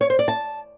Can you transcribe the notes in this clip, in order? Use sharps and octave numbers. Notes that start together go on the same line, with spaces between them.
C#5
C5
D5
A5